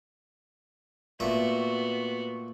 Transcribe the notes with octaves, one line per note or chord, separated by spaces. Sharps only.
A#2 A3 B3 F#4 E5